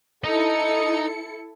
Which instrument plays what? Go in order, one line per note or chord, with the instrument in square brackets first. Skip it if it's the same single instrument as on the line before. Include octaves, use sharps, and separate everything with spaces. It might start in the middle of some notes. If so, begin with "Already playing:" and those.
[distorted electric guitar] D#4 D#5 [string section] E4 A4 C#7